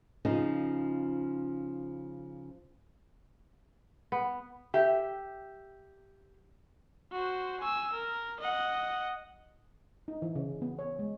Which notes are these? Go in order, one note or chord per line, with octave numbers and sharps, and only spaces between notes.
C#3 F3 D#4
B3
G4 E5
F#4 C5
G#5 E6
A#4
D#5 F#5
D#4
E3
C#3
B3
C#5
G#3